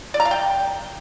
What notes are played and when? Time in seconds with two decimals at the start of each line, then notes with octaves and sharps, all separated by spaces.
0.14 D5
0.20 A#5
0.25 F5
0.31 G5